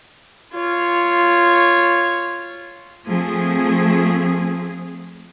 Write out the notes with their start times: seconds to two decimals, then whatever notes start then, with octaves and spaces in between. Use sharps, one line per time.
0.54 F4 C#5
3.06 F3 A3 C4 G#4